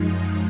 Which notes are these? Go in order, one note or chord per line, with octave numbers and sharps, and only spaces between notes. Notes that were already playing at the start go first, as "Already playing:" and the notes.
Already playing: F#2 F3 G#3 D#4